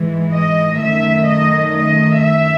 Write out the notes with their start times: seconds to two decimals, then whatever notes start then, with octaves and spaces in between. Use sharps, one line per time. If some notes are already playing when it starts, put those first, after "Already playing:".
Already playing: G#2 E3 G#3
0.33 D#5
0.80 F#2 D#3 A3 E5
1.27 D#5
1.75 D#5
2.21 E5